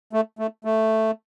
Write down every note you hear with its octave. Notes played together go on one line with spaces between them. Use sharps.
A3
A3
A3